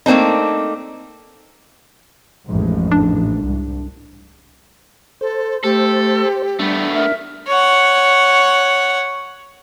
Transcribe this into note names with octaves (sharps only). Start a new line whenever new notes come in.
A3 A#3 C4 D4 D#4
A1 F2 G#2
D4
C2
A4 C5
A3 G4 A4
G3 A3 B3 D4
A#4 E5
C#5 F#5